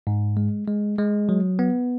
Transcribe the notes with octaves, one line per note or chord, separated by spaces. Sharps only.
G#2
G#3
G#3
G#3
F#3
B3